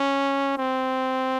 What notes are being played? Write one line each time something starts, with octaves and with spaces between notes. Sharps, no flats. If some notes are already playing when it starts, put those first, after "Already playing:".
Already playing: C#4
C4